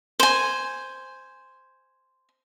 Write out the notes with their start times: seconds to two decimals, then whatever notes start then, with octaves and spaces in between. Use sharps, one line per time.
0.20 C5 G#5